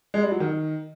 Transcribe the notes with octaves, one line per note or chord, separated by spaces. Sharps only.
G#3
G3
F#3
D#3